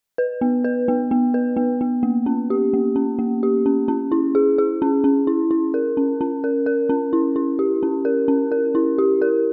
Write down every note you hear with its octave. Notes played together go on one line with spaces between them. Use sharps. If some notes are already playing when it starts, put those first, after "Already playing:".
B4
B3
B4
B3
B3
B4
B3
B3
A#3
C#4
G4
A#3
C#4
A#3
G4
C#4
C#4
E4
G#4
G#4
C#4
C#4
E4
E4
A#4
C#4
C#4
A#4
A#4
C#4
E4
E4
G4
C#4
A#4
C#4
A#4
E4
G4
A#4